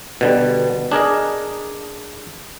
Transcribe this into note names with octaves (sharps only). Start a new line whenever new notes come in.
B2 D3 G3
D4 G#4 A#4 D#5